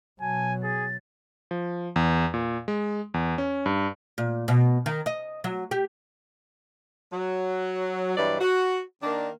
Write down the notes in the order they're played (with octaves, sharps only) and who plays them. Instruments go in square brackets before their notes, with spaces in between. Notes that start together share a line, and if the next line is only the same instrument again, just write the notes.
[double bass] B2 F#3 [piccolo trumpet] G#5 [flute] A5
[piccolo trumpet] G#4 [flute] A6
[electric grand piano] F3
E2
A#2
G#3
E2
C#4
G2
[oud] A#2
B2
D#3
D#5
F#3
G4
[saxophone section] F#3
G2 B2 E3 F#3 D5
F#4
D#3 A#3 D4